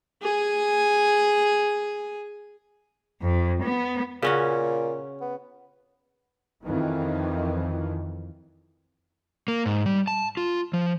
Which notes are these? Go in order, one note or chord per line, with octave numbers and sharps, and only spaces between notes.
G#4 G#5
F2
B3
A#2 C#3 C#4 F#4
B3
F2 D#3 E3
A#3
G#2
G3
A5
F4
F3